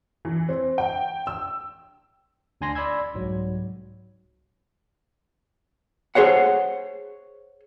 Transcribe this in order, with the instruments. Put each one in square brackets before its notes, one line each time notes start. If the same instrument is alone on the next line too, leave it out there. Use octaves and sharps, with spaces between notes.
[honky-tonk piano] E3
C4
G5
E6
[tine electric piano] D2 D4 G#5 C6 A#6
D5 B5 C6 E6 G#6
C2 G#2 F#3
[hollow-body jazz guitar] G#4 C5 C#5 F#5